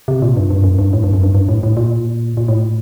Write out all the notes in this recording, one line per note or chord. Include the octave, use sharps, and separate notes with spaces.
C3
A#2
G2
G2
F#2
G2
A2
G2
F#2
G2
G2
A2
A2
A#2
A#2
A2